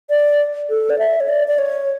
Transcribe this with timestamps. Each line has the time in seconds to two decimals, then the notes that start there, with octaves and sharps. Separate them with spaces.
0.10 D5
0.70 A4
0.90 D5
0.99 E5
1.20 C#5
1.28 D5
1.48 D5
1.58 C#5